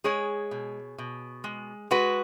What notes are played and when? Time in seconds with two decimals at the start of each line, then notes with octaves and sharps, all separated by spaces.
0.04 G#3 G#4 C#5
0.51 B2
0.98 B2
1.44 G#3
1.91 G#3 F#4 B4